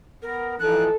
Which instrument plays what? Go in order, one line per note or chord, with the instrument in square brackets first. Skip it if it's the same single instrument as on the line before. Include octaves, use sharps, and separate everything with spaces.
[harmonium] B3 [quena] A#4
[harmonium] E3 F3 D#4 [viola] A4 [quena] F#6